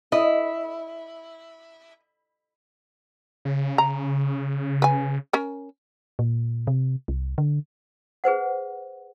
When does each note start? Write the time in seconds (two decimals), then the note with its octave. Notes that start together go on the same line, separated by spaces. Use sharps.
0.12 E4 D#5
3.45 C#3
3.78 A#5
4.82 B4 G#5
5.33 C#4 A#4
6.19 A#2
6.67 C3
7.08 C2
7.38 D3
8.24 G#4 B4 C5 F#5